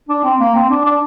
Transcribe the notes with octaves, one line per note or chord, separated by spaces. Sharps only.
D4
C4
A#3
C4
D4
D4